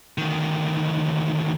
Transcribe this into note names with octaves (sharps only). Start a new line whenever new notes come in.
D2 D#3